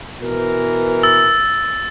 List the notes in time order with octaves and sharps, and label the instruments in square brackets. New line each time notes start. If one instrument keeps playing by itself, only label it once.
[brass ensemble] B2 E3 A#4
[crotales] E6 A6